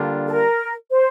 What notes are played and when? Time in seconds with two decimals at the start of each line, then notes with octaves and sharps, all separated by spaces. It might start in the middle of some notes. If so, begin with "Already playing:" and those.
Already playing: D3 G3 A#3 D4 F4
0.27 A4
0.32 A#4
0.90 C5